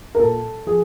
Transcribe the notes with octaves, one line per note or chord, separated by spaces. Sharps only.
A#4
A#2 A4
F3 G#4